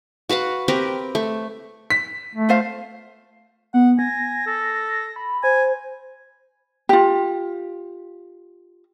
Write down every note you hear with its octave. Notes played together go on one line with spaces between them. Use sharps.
F#4 B4 F5 F#5
C4 G4 A#4 B4
A3
B6
A3
F4 C5 F5
B3 F#5
G#5 A#6
A4
B5
C5 G#5
F4 G4